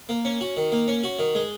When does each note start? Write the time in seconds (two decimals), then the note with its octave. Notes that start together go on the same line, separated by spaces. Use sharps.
0.09 A#3
0.25 C#4
0.41 F#4
0.57 D#3
0.72 A#3
0.88 C#4
1.04 F#4
1.19 D#3
1.35 G#3